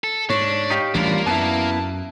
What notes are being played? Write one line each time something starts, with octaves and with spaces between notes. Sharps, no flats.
A4
G#2 D4 C#5
D#4 G4 F5
A1 D2 G3 A#3 D4 F4 A#4
F#2 B3 E4 A5